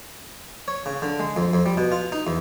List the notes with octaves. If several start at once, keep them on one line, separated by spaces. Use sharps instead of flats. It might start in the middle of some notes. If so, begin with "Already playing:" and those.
C#5
C#3
D3
G#3
F2
F2
G3
B2
F4
D#4
E2